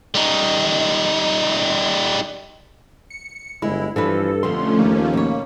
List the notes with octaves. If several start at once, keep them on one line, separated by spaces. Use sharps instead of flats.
G3 D#4
C#7
G1 G#3 E4
G2 E3 F3 A4 B4
F2 B2 D3 F3 A3 C#4 C6
D#2 A#3
B2 C#5